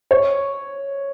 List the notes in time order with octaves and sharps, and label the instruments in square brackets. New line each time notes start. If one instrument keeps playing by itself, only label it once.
[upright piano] C#5